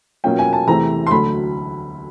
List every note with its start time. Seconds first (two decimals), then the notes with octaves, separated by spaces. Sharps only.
0.24 B2 F#3 A#3 C#4 F4 G5
0.39 G#5
0.53 A5
0.67 E2 C3 E3 A3 C4 A#5
1.07 C6
1.11 D2 D3 F#3 A3 B5